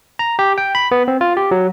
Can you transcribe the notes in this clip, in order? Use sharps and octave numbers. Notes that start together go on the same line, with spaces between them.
A#5
G4
G5
B5
B3
C4
F4
G4
F#3